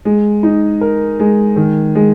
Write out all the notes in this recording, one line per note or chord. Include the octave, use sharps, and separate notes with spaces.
G#3
D#4
A#4
G#3
D#3
G#3